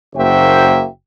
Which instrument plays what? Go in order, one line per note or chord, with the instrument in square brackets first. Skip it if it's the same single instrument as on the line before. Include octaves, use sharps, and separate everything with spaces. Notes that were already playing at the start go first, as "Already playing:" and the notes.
[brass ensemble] F#1 A#3 F#4 C5 E5 G5